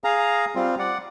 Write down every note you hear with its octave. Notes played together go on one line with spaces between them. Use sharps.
G#4 F5 A#5
G3 C4 F4
D5 F#5